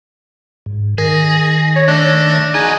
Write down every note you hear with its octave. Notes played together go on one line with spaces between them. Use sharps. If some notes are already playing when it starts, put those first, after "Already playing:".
G#2
D#3 G#4 A#6
C#5
A3 D4 A4
D#4 F#4 G#4 G#5